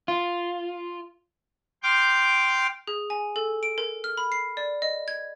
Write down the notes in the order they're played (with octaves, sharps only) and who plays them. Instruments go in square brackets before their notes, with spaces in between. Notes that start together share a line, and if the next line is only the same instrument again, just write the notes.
[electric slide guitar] F4
[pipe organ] G5 C6 D6 F6 G6
[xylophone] G#4
G#5
A4
D7
A#4
F6
B5
C7
D5
D#5
G#6